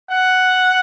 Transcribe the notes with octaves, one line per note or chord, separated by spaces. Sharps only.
F#5